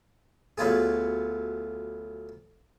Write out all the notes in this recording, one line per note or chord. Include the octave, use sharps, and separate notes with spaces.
D2 F#3 B3 F4 G#4